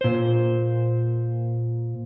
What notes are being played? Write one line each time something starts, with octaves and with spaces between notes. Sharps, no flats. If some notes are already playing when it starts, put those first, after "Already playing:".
A#2 C5